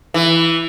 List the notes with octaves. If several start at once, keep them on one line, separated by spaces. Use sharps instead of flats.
E3